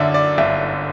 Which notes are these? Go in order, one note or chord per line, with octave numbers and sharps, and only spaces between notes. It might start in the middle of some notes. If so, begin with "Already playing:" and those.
Already playing: F#2 D3 D5 E5
D5
G1 E5